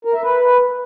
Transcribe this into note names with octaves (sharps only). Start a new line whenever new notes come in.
A#4
E5
B4